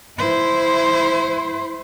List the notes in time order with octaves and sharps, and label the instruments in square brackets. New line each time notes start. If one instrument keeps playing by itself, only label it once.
[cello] E4 C5